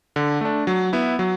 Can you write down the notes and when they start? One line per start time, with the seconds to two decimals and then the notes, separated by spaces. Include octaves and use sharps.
0.16 D3
0.41 A3 D4
0.67 F#3
0.93 B3 E4
1.19 F#3